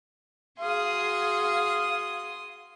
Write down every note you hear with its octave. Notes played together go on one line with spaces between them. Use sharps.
F#4 G#4 F5 C6 D#6